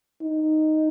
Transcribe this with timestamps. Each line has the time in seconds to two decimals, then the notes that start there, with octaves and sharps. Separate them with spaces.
0.22 D#4